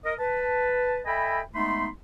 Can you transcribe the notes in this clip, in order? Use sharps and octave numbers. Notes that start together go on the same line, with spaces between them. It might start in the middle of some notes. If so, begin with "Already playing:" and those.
A#4 D#5
B4 A5
A4 D#5 E5 G5 G#5 B5
G#3 A3 B3 D#4 B5 C6